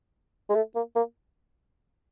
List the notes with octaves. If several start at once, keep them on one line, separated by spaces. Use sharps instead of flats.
G#3
A3
A#3
A#3